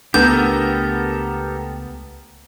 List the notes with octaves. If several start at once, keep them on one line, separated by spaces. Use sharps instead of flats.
C#2 A3 B3 D4 G4 A4 A#4 G6